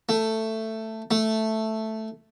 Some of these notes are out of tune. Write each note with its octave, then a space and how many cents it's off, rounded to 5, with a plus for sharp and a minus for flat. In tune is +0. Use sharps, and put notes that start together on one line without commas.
A3 +10
A3 +0